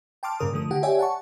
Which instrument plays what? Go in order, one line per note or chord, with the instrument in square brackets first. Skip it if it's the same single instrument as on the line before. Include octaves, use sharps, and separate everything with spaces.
[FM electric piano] G5 A5 C6 D6 F6
G2 A#2 C#3 A#4 D6 D#6
D3 F3 A3 D#6
D3 G4 F#5
G4 C#5 D5 E5 G5 G#5
F#5 A5 C#6